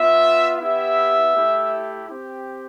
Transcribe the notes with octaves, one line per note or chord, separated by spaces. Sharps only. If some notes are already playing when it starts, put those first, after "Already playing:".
Already playing: B3 F4 E5
B3 E4 G4 E5
A3 E4 G4
C4 G4